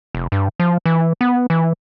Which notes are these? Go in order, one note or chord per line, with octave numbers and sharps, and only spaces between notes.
F1
G2
F3
E3
B3
E3